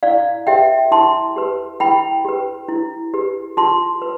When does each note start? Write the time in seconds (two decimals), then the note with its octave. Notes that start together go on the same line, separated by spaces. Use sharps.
0.03 E4 D5 F5
0.47 G4 B4 E5 G5
0.91 E4 A5 C6
1.36 G4 B4
1.80 E4 G5 B5
2.25 G4 B4
2.69 E4
3.14 G4 B4
3.57 F4 A5 C6
4.02 B4